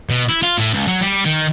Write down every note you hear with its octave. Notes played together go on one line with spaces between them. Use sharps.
B2
E4
F4
A2
C#2
F#3
G3
D#3